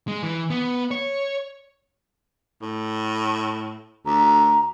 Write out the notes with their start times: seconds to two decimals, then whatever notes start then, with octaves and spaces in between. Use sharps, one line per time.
0.08 G#3
0.23 E3
0.50 B3
0.91 C#5
2.62 A2
4.06 D2 A#5